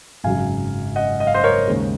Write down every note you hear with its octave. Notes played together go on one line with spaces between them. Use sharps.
G#1 F#2 C#3 F#3 F5 G#5
D#5 F#5
D#5
F5
C5 D#5
A#4 C#5
D#2 C#3 G#3